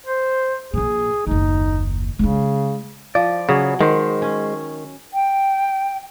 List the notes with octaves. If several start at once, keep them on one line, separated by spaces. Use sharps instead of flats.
C5
A#1 A#2 G#4
F#1 D#2 D#4
C#3 G#3 E4
F3 D5
C#3 F#3 G#4
D#3 G#3 C5
C#4
G5